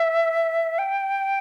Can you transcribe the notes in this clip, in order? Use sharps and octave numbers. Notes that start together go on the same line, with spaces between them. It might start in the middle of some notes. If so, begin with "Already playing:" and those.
Already playing: E5
G5